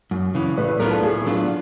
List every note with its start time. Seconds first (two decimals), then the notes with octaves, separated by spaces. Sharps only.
0.11 F#2
0.35 C#3 E3
0.57 A2 B4
0.69 B4
0.80 F#3 B3 D4 F4 A#4
0.92 A4
1.03 A2 G#4
1.26 F#3 B3 D4 F4